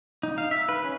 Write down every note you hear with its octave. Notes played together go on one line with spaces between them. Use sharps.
D#4
F5
E5
B4
C#4